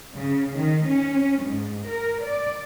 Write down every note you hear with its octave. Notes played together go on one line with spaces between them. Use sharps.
C#3
D#3
C#4
G#2
A#4
D5